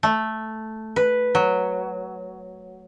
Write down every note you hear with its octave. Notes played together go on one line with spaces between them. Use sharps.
A3
B4
F#3